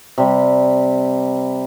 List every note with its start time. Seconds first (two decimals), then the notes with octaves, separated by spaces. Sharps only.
0.18 C3 G3